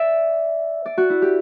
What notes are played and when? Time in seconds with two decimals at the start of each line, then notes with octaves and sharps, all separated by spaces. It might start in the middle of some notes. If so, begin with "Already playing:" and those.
Already playing: D5 E5
0.86 D5
0.98 F#4
1.10 E4
1.22 G4